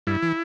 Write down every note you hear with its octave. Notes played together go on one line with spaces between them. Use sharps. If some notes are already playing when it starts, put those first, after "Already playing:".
G2 E4
E3